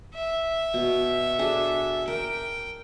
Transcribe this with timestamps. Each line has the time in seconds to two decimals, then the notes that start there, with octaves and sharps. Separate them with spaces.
0.14 E5
0.74 B2
1.39 D4 G#4 A4
2.08 A#4 G5